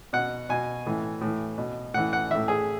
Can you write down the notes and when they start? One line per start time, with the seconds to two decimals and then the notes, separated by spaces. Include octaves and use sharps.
0.13 B2 F#5
0.49 B2 G#5
0.86 A2 E3
1.21 A2 E3
1.58 B2
1.94 A2 E3 F#5
2.13 F#5
2.30 A2 E3 E5
2.48 G#4